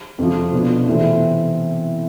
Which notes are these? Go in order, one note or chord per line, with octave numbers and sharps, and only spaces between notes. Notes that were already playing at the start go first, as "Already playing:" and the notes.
F2 C3 F3
B2 B3 D4 F4
C3 E3 A3 C4 E4